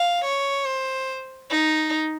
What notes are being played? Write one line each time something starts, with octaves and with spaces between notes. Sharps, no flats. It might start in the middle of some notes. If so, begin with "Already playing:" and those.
Already playing: F5
C#5
C5
D#4